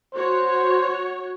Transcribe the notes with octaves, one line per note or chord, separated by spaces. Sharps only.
F#4 C5 C#5